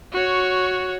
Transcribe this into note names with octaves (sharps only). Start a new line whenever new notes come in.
F#4 C#5